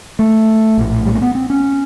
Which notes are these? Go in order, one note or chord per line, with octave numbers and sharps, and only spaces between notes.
A3
A#1 A2
G3
A#3
B3
C4
C#4